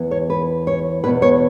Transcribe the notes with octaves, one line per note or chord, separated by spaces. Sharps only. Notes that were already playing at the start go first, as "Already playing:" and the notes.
Already playing: E2 E3 B3
C#5
B4
C#5
E2 B2 B3 B4
C#5